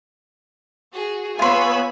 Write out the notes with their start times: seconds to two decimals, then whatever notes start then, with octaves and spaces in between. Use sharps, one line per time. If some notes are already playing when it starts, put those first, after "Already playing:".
0.92 F#4 G#4
1.39 B3 F4 B4 C#5 G#5 B5 C6 E6